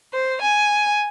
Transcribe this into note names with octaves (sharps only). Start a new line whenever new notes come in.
C5
G#5